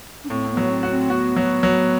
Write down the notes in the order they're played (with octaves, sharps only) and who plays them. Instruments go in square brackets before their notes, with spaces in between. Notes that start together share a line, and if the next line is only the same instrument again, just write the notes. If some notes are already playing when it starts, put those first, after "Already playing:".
[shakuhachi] D4
[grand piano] A2 [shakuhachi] C4
[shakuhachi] B3
[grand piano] F#3
[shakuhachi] C4
[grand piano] F#4
[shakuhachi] C4
[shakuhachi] B3 [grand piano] F#4
[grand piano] F#3
F#3